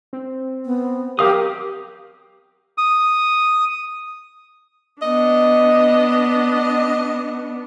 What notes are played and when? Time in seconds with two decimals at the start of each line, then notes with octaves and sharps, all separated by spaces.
0.13 C4
0.65 B3
1.19 F#3 G4 A#4 F5 G5 D#6
2.78 D#6
5.02 B3 D4 D#5